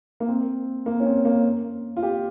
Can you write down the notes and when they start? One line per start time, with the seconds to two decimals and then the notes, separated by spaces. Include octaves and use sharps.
0.20 A#3
0.28 C4
0.86 A#3
1.00 C#4
1.05 C4
1.25 A#3
1.97 F4
2.03 G4